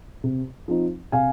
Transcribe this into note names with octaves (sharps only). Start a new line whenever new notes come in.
C3
F3 C4 D#4
C3 F5 G#5